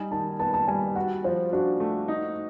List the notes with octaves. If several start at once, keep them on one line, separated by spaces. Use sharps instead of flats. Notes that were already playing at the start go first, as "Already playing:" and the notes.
Already playing: G3 D#4 G#5
D#3 A5
B3 A5
A5
G3 G#5
F#4 F#5
F3 C5
D4 F#4
A3
D#4